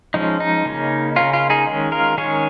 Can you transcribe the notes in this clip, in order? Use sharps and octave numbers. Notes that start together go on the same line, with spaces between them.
F3 G#3 C#4 D#4
D#4
C#3 A#3 C#4
C#3 A#3 C#4 F4
F4
D#4 G#4
D#3 G#3 C#4
F4 A#4
D#3 G#3 C#4 G#4 C#5